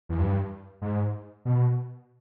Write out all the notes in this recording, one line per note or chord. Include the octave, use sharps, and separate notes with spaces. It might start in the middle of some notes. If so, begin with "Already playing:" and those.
E2
G2
G#2
B2